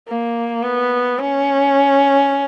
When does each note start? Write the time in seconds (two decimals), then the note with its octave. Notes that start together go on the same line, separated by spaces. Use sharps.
0.08 A#3
0.63 B3
1.18 C#4